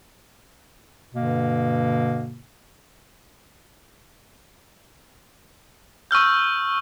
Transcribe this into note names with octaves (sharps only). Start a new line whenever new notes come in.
G2 B2 D3 A#3
C#6 E6 F6 G6